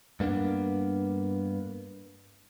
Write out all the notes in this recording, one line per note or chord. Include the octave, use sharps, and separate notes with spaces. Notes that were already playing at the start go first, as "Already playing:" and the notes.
G2 A#3 B3 D4